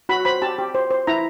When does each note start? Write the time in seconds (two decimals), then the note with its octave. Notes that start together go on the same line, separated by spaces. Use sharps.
0.09 F#4 B5
0.25 C5 B5
0.42 G4 A5
0.58 G4
0.75 C5
0.91 C5
1.07 E4 A#5